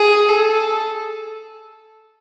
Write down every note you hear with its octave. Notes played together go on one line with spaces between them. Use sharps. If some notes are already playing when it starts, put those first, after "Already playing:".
Already playing: G#4
A4